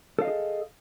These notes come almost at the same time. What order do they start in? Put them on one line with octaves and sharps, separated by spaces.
A4 F5 D#5 G#4